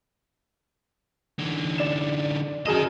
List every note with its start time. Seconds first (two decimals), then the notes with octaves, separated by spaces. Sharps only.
1.38 D3 E3
1.78 D5 E7
2.66 F#2 G#4 A#4 D#5 E7